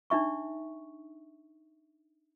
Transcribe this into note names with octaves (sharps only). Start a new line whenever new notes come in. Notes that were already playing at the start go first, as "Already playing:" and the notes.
D4 D#4 E5 C#6